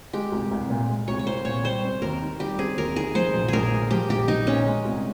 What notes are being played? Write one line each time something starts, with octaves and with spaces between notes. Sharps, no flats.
G#3 G4
C2
C2
A#2
G#3
C2 C#5
C#5
C2 C5
A#2 C#5
G3 C5
C4
D#2 A#4
D#3
G3 G4
C4 G#4
D#2 A#4
D#3 G#4
F3 C5
A#1
A#1 G#4 A#4
A#2
F3 G4
A#1 G4
A#1 D#4
A#2 C#4
G#3
C2